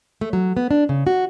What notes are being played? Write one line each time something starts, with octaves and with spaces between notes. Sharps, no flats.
A3
F#3
B3
D4
C#3
F#4